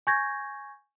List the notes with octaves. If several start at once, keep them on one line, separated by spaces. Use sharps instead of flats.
G#5 C#6 G6 G#6 A#6